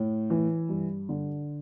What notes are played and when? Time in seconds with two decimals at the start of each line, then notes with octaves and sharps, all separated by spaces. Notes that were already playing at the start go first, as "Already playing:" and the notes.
Already playing: A2
0.30 E3
0.69 G2
1.09 D3